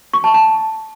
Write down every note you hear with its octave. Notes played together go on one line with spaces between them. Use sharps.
C#6
A5
A5